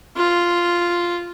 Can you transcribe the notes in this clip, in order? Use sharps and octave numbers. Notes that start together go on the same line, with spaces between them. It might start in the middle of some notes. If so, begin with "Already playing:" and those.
F4